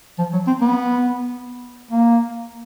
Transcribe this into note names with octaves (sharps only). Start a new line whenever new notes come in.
F3
F#3
C4
B3
A#3